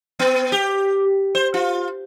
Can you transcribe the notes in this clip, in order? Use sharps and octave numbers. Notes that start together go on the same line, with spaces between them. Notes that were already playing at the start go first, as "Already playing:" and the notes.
B3
G4
C5
F4